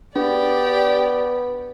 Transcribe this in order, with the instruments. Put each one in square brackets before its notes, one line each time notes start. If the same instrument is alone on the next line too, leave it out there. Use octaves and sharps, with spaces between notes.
[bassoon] B3 [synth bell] D4 [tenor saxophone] G4 [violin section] D5